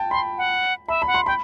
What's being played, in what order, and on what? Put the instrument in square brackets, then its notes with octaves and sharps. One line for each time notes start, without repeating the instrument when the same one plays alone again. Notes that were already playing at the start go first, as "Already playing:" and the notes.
Already playing: [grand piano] G5 A5
[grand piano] B5 [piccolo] C6
[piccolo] F#5
[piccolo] E5 [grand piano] B5
[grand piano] B5
[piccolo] F#5
[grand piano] C6
[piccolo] G5 [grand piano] B5